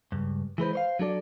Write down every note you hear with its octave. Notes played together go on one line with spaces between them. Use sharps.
C#2 G2
E3 G#3 B4 C5
C5 C#5 F5
F#3 D4 A4 D5